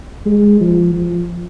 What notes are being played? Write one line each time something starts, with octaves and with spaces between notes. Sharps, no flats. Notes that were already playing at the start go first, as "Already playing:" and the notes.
G#3
F3
F3